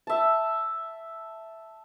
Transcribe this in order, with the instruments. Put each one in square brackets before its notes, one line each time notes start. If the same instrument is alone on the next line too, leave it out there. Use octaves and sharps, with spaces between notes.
[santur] E5 A5